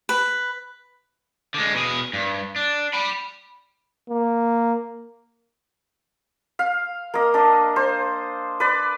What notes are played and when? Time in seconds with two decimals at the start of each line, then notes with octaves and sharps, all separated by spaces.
0.09 B4
1.54 D3 G#3
1.74 B2 G#4
2.13 G2
2.56 D4
2.93 G5 B5
4.10 A#3
6.59 F5
7.14 A#3 D#5
7.34 D4 D#5
7.76 C5
8.60 B4 D5